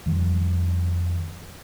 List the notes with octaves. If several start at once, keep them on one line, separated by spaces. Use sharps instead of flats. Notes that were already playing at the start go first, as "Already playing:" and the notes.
F2 D#3 F3 G3